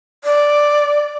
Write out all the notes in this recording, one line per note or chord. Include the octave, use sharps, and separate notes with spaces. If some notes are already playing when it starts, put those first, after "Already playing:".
D5